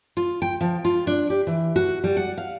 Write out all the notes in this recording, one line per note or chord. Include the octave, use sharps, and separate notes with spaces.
F4
G5
F3
F4
D4
G4
E3
F#4
G3
F#5
F5